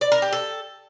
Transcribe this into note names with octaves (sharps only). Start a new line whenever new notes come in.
D5
A#4
G4
A4